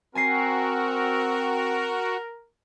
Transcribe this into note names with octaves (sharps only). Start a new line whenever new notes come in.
C4 F#4 A#4 G#5 A#6 C7